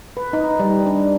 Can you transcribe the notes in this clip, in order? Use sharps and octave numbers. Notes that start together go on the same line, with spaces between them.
B4
D#4
G3
D4